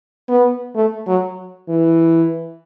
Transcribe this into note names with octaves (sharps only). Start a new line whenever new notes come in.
B3
A3
F#3
E3